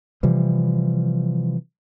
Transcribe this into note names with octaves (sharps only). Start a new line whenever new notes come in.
C3 E3 F3 G3